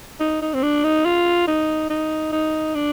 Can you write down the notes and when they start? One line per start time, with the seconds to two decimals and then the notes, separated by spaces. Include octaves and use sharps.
0.20 D#4
0.42 D#4
0.54 C4
0.63 D4
0.84 D#4
1.05 F4
1.47 D#4
1.90 D#4
2.32 D#4
2.75 D4